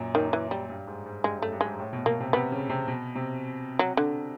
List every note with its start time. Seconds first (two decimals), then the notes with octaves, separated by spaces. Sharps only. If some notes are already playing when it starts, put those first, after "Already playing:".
Already playing: F#2 A#2
0.15 F#2 D#3
0.33 E3
0.51 G3
0.69 G2
0.87 G#2
1.06 G#2
1.24 G2 G#3
1.38 F#2 A3
1.52 G2
1.61 G#2 G#3
1.79 A2
1.93 B2
2.06 B2 A#3
2.20 C3
2.33 C3 B3
2.52 C#3
2.70 C3
2.87 B2
3.15 C3
3.79 F#3
3.97 D3